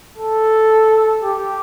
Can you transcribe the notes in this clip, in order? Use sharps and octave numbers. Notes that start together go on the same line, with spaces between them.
A4
G4